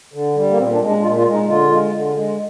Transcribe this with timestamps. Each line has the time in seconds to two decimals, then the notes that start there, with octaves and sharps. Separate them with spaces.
0.13 D3
0.36 G3
0.50 A#3
0.58 A#2 C4
0.73 D4
0.81 G#3
0.88 D4
1.03 A#2 F4
1.18 F4
1.25 G#3
1.33 D#4
1.47 D3 F4
1.70 G#3
1.92 D3
2.15 G#3